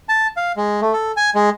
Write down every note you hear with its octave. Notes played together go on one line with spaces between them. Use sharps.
A5
F5
G#3
A3
A4
G#5
G#3